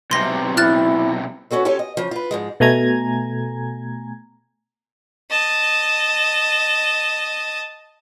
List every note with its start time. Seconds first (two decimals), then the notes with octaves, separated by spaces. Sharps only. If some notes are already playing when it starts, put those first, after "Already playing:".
0.11 B1 C3 C6 A#6
0.57 E4 F6 F#6 A6
1.51 B3 C#4 F#4 A4 C5
1.65 C#4 F4 G4 A4 C#5 G#5
1.79 D#5
1.97 C#3 F3
2.11 F4 B4
2.31 G#2 F3 G#3
2.60 B2 A3 G#5 A#5 G#6
5.30 D#5 A5